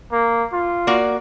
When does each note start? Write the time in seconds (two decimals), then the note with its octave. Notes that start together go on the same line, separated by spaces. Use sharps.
0.12 A#3
0.53 F4
0.87 A#3 F#4 D5